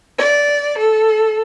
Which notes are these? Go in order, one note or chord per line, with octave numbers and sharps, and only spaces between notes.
D5
A4